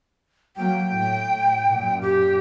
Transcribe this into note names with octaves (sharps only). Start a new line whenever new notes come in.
F#3 A#3 G5
A2
F#2 A#2
G4